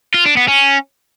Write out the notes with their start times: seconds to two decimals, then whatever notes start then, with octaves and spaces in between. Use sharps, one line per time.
0.14 F4
0.26 D4
0.37 B3
0.48 C#4